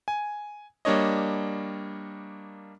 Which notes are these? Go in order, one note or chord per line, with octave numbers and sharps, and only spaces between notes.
G#5
G3 A#3 D4 C#5 D#5